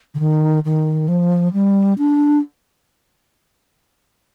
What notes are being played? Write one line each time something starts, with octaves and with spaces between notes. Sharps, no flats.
D3
D#3
D#3
F3
G3
D4